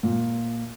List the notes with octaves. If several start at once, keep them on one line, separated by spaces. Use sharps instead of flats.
A#2